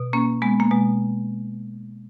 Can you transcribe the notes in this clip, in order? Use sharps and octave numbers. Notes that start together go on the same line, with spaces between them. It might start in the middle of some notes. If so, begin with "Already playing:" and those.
Already playing: B2
A#3 C#4
G#3 B3
A#3
B2 G#3